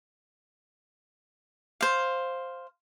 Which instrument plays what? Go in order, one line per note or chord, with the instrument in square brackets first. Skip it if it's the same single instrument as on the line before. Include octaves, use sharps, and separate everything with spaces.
[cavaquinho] C5 F5